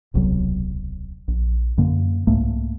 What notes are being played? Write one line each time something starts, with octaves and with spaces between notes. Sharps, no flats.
D1 B1 C3 F#3
A#1
F#2 D3 A#3
C2 G#2 A3 A#3